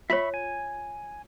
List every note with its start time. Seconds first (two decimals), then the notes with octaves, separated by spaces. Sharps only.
0.10 F4 C#5 E5 B5 C#6
0.34 G#5